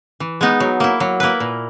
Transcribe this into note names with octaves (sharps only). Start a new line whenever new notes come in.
E3
G#3 B3 D#4
F#3
A#3 E4
F#3
A#3 E4 B4
A#2